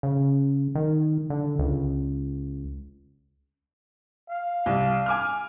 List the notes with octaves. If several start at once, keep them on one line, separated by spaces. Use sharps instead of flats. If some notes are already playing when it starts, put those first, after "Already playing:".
C#3
D#3
D3
C#2
F5
C2
G#5 D6 F6